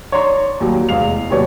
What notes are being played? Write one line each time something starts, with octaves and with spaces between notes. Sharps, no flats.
C#5 D5 A#5 C6 C#6
D#2 F#3 G3
F1 E2 G#3 F5 C7 F7
D#2 C3 F#3 B4 C#5 D5